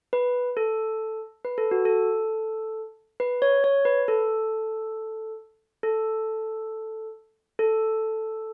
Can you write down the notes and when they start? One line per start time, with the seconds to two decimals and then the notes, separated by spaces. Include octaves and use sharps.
0.13 B4
0.57 A4
1.45 B4
1.58 A4
1.71 F#4
1.85 A4
3.20 B4
3.42 C#5
3.64 C#5
3.85 B4
4.08 A4
5.83 A4
7.59 A4